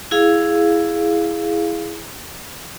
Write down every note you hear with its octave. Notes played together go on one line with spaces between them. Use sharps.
E4 G#4 F5